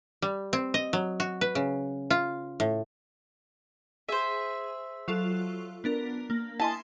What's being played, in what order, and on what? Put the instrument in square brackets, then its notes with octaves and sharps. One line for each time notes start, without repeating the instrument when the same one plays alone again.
[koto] G3
C4
D#5
F#3
F#4
B4
C#3
F4
A2
[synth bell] G#4 [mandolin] C5 E5
[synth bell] F#3 F4 A4
B3 D4 A#4
A#3
[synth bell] E4 G#5 C6 [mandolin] D#5 A5